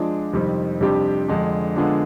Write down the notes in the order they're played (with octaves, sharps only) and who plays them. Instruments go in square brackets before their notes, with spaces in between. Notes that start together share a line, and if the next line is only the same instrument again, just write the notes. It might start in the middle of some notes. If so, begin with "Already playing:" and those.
Already playing: [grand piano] F3 G#3 D4 F4
F2 C3 D#3 G3 C4
F2 C3 G3 D4 G4
F2 D3 G#3 D4
D3 F3 G#3 B3 D4